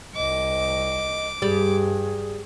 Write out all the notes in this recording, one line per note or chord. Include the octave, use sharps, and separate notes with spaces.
C2 D#5 D6
G2 G3 G#4